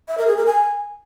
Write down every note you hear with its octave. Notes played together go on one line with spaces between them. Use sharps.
E5
A#4
G#4
A#4
G#5